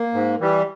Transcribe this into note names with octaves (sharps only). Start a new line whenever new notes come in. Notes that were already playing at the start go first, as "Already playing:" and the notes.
Already playing: A#3
G#2
E3 G3